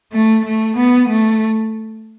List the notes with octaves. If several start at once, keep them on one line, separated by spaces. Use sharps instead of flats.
A3
A3
B3
A3